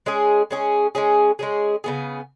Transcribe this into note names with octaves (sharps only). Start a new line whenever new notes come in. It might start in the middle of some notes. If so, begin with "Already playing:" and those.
G#3 C#4 G#4
G#3 C#4 G#4
G#3 C#4 G#4
G#3 C#4 G#4
C#3 B3 G#4